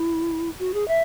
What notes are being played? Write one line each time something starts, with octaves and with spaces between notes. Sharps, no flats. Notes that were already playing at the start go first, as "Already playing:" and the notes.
Already playing: E4
F#4
G#4
E5